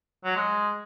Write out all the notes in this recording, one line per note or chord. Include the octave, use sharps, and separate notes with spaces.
F#3
G#3